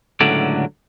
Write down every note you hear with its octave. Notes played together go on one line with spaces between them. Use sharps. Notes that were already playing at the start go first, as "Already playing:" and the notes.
C#2 A2 D3 F#3 D5